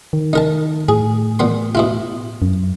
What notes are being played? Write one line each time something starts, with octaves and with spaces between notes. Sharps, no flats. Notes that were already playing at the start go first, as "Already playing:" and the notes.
D#3
D#4 A#4 A5
A2 G#4
A#2 B3 C6
B2 E4 F4
F#2